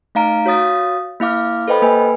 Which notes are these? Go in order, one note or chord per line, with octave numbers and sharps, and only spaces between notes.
A3 D#4 F5 A#5 D7
F#4 C#5 F5 D#6 A6
A#3 E4 F5 D6 F6
A4 B4 C5 D#5 G5 B5
A#3 B4 G#5